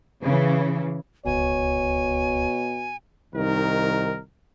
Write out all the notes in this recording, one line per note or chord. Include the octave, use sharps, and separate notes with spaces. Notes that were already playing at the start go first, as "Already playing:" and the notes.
C#3 E3
D1 C#2 B2 C#5 G#5
C2 D#3 D#4 A#4